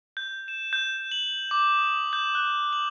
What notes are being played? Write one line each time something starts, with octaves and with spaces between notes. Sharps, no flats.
G6
E7
G6
F#7
D6
D#6
G6
F#6
F#7